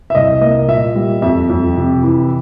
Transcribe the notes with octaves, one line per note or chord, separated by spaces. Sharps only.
E5
C2 D#5
A#3 D#5
A#2 E5
G3
F2 E5
F2
C3
E3